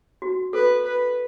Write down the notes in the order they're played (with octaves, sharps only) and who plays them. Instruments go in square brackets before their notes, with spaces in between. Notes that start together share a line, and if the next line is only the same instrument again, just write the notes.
[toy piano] F#4
[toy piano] A4 [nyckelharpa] B4
[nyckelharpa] B4